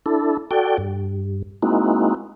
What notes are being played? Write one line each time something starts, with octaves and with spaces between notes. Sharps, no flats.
D4 E4 A4
F#4 A4 D5 G5
G2
G#3 A#3 C4 D#4 E4 F#4